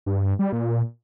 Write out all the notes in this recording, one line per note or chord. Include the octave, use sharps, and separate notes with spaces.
G2
G3
A#2